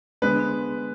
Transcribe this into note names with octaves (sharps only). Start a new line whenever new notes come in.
D3 G#3 B3 B4